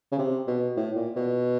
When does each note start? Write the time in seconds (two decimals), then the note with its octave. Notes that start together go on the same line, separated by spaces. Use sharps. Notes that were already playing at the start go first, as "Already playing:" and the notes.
0.12 C#3
0.19 C3
0.47 B2
0.77 A2
0.96 A#2
1.16 B2